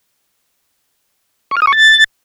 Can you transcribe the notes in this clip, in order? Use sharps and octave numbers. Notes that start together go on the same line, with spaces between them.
C#6
F6
D#6
C#6
A6